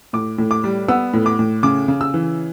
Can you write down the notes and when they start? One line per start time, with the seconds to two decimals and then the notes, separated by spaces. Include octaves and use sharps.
0.13 A2 D6
0.38 A2
0.51 D6
0.64 G3
0.88 B3 E6
1.13 A2
1.26 D6
1.39 A2
1.63 C#3 D6
1.88 C#3
2.01 E6
2.14 E3